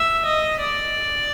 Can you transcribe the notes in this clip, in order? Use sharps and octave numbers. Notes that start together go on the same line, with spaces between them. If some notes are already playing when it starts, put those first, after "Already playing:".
Already playing: E5
D#5
D5